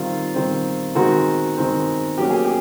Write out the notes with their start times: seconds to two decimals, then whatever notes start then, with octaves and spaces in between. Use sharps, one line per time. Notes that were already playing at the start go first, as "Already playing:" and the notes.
Already playing: D#3 G3 C4 F4
0.34 D#3 G3 C4
0.95 D#3 G#3 C4 F#4
1.56 D#3 G#3 C4
2.17 B2 F#3 A#3 C#4 G4
2.30 G#4
2.45 G4